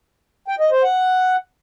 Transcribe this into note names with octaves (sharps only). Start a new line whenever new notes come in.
G5
D#5
C5
F#5